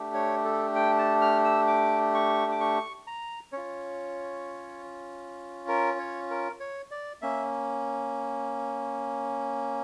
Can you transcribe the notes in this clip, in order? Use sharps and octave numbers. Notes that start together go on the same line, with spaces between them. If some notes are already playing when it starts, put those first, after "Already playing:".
Already playing: A3 D4 G4
C#5
A4
G5
A5
F6
E6
D6
C#6
D6
C#6
A#5
C#4 F4 C#5
A#4
C#5
A#4
C#5
D5
A#3 C#4 E5